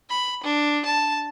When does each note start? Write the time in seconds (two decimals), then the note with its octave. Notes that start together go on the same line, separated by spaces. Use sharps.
0.10 B5
0.44 D4
0.86 A5